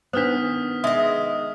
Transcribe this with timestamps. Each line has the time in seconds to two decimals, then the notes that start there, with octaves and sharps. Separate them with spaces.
0.13 D#3 B3 D4 C5 D#6 F6 B6
0.84 G#3 D#5 E5 D#6